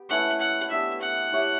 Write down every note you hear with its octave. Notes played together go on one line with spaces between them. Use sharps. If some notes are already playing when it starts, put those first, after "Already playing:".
Already playing: B3 G4
A3 C#4 E4 B4 F#5
F#5
B3 D4 G4 E5
F#5
E4 G4 C#5 E5